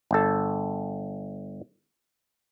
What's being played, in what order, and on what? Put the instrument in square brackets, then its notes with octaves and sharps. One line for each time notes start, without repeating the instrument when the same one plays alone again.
[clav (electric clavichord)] G1 A4